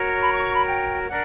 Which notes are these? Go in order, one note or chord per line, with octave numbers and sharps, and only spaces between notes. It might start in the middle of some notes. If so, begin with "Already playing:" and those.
Already playing: F#4 A#4 C#5
B5
C#6
C#6
B5
G5
D4 A#4 F#5